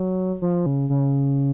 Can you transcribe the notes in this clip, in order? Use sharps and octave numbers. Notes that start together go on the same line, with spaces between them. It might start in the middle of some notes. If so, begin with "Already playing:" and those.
Already playing: F#3
F3
C#3
C#3